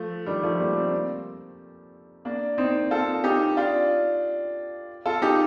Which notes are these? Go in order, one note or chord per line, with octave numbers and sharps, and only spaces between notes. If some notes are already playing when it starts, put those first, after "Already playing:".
Already playing: F3 A3
D#3 G3
F3 A3
G3 A#3
D4
A3 C4
A#3 D4
C4 D#4
F4 A4
D#4 G4
D4 F4
F4 A4
D#4 G4